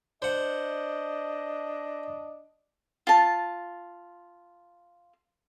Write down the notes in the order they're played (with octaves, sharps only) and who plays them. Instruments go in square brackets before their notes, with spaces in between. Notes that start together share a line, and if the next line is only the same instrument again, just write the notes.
[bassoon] D4 [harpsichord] C5 F#5 [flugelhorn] D#5
[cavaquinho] F4 A5